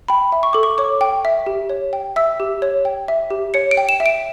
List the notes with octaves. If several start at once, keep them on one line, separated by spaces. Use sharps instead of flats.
G5 B5
E5
C#6
A4 D6
C#6
C#5 D6
G5
E5
G4
C#5
G5
E5 E6
G4
C#5
G5
E5
G4
C#5 C#7
D7
G5
E7
E5
D7